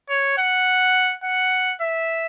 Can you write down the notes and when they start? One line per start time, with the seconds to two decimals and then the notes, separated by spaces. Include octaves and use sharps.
0.10 C#5
0.38 F#5
1.24 F#5
1.81 E5